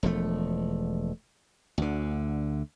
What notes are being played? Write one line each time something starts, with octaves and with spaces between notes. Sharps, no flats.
E1 F3 A3
D2 D3